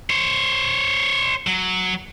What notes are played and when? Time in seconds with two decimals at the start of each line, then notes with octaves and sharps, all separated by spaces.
0.10 C5 C#5
1.47 F#3